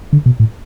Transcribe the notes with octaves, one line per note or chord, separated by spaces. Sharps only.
D3
B2
A2